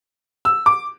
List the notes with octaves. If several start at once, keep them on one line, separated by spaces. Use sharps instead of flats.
E6
D6